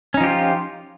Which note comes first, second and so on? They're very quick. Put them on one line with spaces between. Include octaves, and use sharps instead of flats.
C#4 D#4 F3 G4 F4